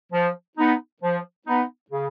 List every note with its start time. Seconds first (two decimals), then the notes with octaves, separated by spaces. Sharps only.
0.12 F3
0.57 B3 D#4
1.02 F3
1.46 B3 D#4
1.91 C#3